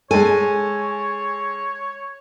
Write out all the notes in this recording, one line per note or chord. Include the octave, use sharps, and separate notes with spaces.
G#3 A4 C#5 G#5